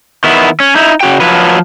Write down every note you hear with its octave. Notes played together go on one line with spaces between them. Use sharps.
D#3 B3 E4
C#4
D#4 E4
C#3 F#4 G5
F3 F#3 B4